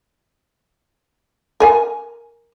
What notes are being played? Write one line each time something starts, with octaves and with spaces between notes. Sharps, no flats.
A#4 G#5